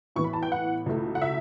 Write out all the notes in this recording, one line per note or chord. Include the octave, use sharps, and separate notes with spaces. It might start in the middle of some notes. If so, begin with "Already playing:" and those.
A2 E3 B3 C#6
B5
A5
G5
F#5
C#2 B2 A3 E4
F#5
E5